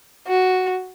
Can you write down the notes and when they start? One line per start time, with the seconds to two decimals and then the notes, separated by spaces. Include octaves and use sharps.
0.27 F#4